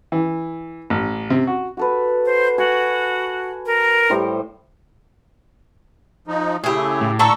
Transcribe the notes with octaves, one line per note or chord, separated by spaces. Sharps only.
E3
A1
C3
F#4
F#4 A4 B4
C5
F#4 G#5
A#4
A2 G3 C5
F3 D#4
C#3 A3 E4 G4 G#4
A2
D3 A4 A#5 C#6 E6